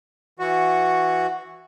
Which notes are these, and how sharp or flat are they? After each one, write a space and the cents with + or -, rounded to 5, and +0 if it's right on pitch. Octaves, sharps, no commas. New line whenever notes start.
E3 +0 F#4 -5 C#6 +0